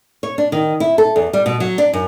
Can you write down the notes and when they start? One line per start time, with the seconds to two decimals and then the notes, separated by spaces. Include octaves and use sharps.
0.23 C#5
0.38 D4
0.52 D#3
0.80 E4
0.98 A4
1.16 E2
1.33 G3
1.46 B2
1.60 F#3
1.78 D4
1.93 F#2